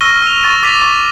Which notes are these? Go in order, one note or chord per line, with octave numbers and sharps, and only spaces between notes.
C#6 E6 F6 A#6 D#7 G7
E6 F7
C#6 A6 D#7
D6 A6 B6 F7
C#6